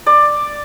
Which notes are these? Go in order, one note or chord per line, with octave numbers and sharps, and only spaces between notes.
D5